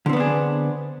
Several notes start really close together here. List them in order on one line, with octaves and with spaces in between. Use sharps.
D3 C4 B3 D4 G#4